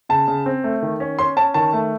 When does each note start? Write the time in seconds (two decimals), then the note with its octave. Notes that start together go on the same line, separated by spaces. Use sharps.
0.09 C#3 A5
0.28 C#3
0.46 C4
0.64 A3
0.82 D#3
1.00 C#4
1.19 C#4 C6
1.36 C#4 A5
1.54 D#3 A5
1.73 A3